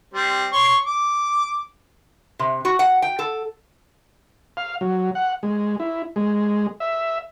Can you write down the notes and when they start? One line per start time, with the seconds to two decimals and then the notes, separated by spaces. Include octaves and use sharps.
0.14 G3 C4
0.52 C#5 C6 C#6
0.86 D6
2.39 C3
2.65 F#4
2.79 F#5
3.02 G5
3.19 A4
4.57 F5
4.81 F#3
5.15 F#5
5.43 G#3
5.80 E4
6.16 G#3
6.80 E5